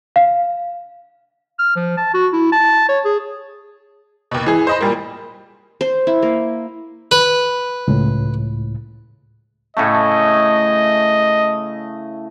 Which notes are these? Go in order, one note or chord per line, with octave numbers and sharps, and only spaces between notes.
F5
F6
F3
A5
F#4
E4
A5
C#5
G#4
D#2 B2
E3 G#4
C5 D#5 B5
A#2 G3 A#3
C5
E4
A#3
B4
C#2 A2
A2 C#3 A3 D#5